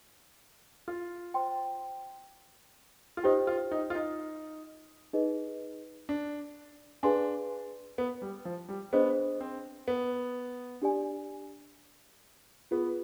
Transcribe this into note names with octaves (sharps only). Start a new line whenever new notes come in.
F4
C5 G5 C6
F4
D#4 G4 C5 G5
F4
D#4
F4
D#4
D#4 G#4 B4 D#5
D4
D4 G#4 B4 F5 G#5 C6
B3
G3
F3
G3
B3 D4 G#4 C5 D#5
C4
B3
D4 G4 D5 G#5
B3 F4 G#4 B4